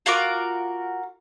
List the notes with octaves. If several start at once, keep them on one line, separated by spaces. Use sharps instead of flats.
F4 F#4 A#4 D6